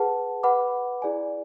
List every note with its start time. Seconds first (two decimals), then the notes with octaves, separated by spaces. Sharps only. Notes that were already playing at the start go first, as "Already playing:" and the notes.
Already playing: G#4 B4 F#5 A5
0.43 B4 F#5 B5 D6
1.02 E4 G#4 D5 G#5